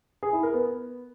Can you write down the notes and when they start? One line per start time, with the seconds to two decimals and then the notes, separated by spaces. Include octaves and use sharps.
0.23 G#4
0.33 E4
0.43 A#4
0.54 B3